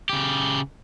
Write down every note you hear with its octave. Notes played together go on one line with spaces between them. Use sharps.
C#3 G4